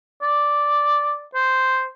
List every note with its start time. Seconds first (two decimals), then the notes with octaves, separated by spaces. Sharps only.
0.22 D5
1.35 C5